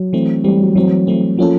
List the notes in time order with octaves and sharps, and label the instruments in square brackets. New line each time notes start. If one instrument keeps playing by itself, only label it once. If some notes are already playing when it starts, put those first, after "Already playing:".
Already playing: [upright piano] F#3
[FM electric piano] E3 A3 C4
[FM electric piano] E3 A3 C4 [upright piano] G3
[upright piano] F#3
[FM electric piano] E3 A3 C4 [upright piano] F#3
[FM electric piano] E3 A3 C4
[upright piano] F3 [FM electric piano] F#3 A#3 C#4 F4 A4